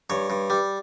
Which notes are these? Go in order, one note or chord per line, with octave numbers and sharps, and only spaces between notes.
G2 C#5
G2
G3